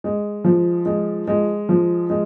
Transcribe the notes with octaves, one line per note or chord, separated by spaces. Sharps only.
G#3
F3
G#3
G#3
F3
G#3